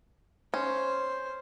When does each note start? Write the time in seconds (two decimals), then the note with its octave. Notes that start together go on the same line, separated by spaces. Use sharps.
0.54 C#4 C5